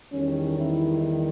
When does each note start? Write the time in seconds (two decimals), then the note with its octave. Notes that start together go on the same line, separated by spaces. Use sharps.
0.11 E2 D#3 G3 C#4
0.57 E4